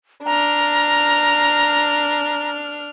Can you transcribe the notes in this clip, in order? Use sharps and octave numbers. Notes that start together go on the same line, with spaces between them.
D4 A#5 F6